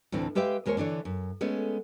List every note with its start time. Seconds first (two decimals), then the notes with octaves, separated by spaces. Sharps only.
0.12 D2 A2 E3 C4
0.35 G#3 G4 B4 E5 F5 G5
0.66 D#2 G#3 A#4 C5 C#5
0.77 D3 E3 D4 C#5
1.05 F#2
1.41 G#3 A3 B3 C#4